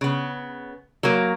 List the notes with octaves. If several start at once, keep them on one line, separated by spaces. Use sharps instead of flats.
C#3 B3
F#3 A#3